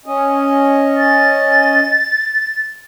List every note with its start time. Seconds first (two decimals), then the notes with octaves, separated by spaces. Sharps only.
0.06 C#4 D#5
0.97 A6